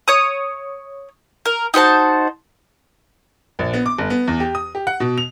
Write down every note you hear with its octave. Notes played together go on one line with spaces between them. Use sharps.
C#5 D#6
A#4
D#4 F#4 C5 A5
A#1
B3
D6
G1
B3
E2
G4
D#6
G4
F#5
B2
F7